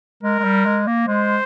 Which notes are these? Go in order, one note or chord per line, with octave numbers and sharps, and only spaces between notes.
G#3 A#4
G#3
G3
G#3
A#3
G#3 C5